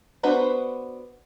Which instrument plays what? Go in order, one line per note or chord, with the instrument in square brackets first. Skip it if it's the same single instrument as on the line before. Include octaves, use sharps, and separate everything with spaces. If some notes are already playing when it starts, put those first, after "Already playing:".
[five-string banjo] B3 D4 F#4 B4 C5